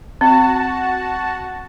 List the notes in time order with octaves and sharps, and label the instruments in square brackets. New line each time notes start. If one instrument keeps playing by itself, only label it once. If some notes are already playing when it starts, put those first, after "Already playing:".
[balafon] C4 [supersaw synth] F#4 A5